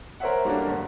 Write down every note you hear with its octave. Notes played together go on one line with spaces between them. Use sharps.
A#4 C5 C#5 E5 F#5
G3 A3 A#3 C#4 D4 F#4
G1